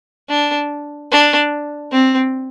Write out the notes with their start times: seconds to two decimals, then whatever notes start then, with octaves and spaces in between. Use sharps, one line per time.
0.29 D4
1.11 D4
1.92 C4